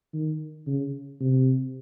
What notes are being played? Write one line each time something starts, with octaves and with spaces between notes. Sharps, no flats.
D#3
C#3
C3